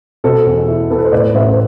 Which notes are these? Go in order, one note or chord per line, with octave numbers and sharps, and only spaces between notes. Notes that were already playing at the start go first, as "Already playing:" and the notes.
B2 A4 C5
E2
E4
B3 A4
B4
C5
A2 B4 D5
A1 C5 E5
C5